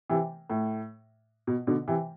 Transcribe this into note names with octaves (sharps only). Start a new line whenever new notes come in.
C3 E3
A2
B2
B2 D3
C3 E3